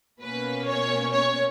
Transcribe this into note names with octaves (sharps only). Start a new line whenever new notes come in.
B2 A#3 C#4 B4
C#5
C#5